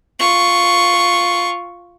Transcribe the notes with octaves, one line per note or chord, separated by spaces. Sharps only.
F4 C#6